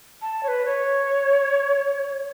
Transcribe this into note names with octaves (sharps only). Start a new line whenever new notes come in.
A5
C#5
B4
C#5